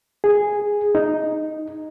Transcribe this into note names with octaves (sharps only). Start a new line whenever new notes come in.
G#4
D#4